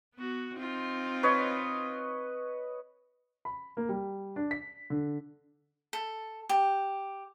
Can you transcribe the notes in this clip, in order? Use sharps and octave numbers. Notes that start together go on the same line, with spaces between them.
B3 F#4
C4 D#4 F4
B4 C#5 D#5
B5
A#3
G3
D4
B6
D3
A4
G4